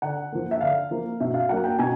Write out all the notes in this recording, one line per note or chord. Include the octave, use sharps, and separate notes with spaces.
D3 F#5
F3 A#3
E5
D3 F5
F3 A#3
B2 E5
F5
F#3 A#3 F#5
G5
B2 G#5